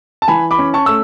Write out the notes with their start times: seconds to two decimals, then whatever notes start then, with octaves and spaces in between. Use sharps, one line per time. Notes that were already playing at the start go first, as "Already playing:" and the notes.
0.22 A5
0.28 E3 G#5 B5
0.51 B5 D6
0.58 C#4
0.74 A5 C#6
0.86 A3 E6